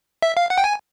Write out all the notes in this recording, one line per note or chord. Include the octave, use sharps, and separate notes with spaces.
E5
F5
F#5
G5
G#5